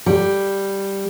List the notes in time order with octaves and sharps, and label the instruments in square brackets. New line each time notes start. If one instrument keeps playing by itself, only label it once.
[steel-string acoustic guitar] G3